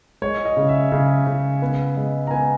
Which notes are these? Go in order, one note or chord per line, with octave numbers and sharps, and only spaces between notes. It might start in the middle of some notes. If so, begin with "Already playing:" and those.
G#3 C#5
D#5
C#3
E5
C#3
C#3
B3
G#3
A#5
B3 G#5